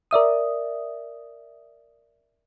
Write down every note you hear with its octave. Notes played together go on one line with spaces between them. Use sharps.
A#4 D5 E5 D#6